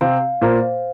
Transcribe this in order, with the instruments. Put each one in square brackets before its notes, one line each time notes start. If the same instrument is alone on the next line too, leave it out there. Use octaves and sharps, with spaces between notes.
[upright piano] C3 C4 [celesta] F5
[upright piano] A#2 A#3 [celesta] C5